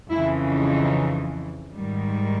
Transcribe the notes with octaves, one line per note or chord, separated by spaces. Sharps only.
F2 C#3 E3 E4
D#4
G#2 D#3 G3